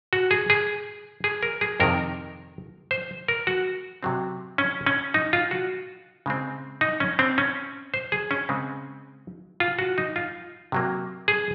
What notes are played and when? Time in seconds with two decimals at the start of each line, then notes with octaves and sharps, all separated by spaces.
0.13 F#4
0.31 G#4
0.50 G#4
1.24 G#4
1.43 A#4
1.61 G#4
1.80 F2 C3 D#3 A#4
2.91 C5
3.28 A#4
3.47 F#4
4.03 C3 F#3 C4
4.58 C#4
4.86 C#4
5.14 D#4
5.33 F4
5.51 F#4
6.26 C#3 G#3 C4
6.81 D#4
7.00 C#4
7.19 C4
7.38 C#4
7.94 C5
8.12 G#4
8.31 C#4
8.49 C#3 G#3 C4
9.60 F4
9.79 F#4
9.98 D#4
10.16 F4
10.72 C3 F#3 A#3
11.28 G#4